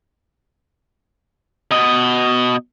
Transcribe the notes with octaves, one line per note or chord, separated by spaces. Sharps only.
B2 D#5